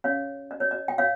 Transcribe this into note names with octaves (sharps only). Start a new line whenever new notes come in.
C#4 G4 C#5 F5
D#5
C#5
D#5
G5
C#5 F5